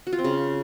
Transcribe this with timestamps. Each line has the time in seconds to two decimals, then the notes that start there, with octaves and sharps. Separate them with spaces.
0.07 F#4
0.13 F4
0.18 C4
0.24 C#3